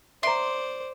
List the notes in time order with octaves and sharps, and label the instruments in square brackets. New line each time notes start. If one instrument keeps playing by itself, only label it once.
[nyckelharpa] C5 D5 [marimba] E5 A#5 [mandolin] C6